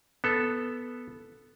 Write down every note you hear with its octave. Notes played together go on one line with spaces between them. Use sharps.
B3 A4